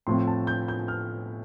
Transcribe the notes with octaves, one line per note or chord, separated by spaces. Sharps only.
A2 F3 A3 C4 C6
A5
G6
G6
F6